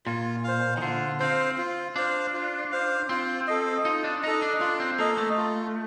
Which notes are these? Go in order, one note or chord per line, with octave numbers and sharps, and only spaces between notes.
A#2 F4
C5 F5
D#3
D3 F4
C4 C5 F5
F4
D4 C5 F5
F4
C5 F5
C4 F4
A4 D#5
D#4 F4
D4
D#4 A4 D#5
D4
D4 F4
C4
A#3 A4 D#5
A3
F4